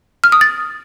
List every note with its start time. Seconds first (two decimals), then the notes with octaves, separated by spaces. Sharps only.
0.24 F6
0.32 D#6
0.41 A6